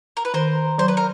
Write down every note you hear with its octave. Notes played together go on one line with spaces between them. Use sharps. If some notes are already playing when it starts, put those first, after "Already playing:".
A#4
B4
D#3 A#4 C5
F#3 C5
B4
A#4